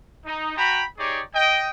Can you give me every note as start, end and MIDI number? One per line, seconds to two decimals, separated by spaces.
0.25 0.55 63
0.57 0.83 66
0.57 0.83 79
0.57 0.83 82
0.57 0.83 83
0.97 1.20 63
0.97 1.20 67
0.97 1.20 68
0.97 1.20 73
0.97 1.20 74
1.34 1.69 75
1.34 1.69 79